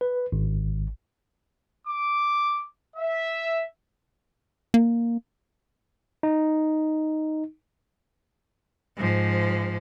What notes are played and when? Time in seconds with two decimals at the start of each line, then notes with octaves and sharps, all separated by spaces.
0.01 B4
0.32 G#1
1.86 D6
2.96 E5
4.74 A#3
6.23 D#4
8.97 G#2 F3